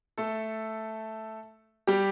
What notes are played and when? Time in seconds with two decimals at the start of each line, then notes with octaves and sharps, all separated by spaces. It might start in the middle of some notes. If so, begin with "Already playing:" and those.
0.18 A3 A4
1.87 G3 G4